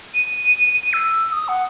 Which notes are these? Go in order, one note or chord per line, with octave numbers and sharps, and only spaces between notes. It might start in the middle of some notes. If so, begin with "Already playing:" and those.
D#7
D#7
D#7
E6
D#6
F#5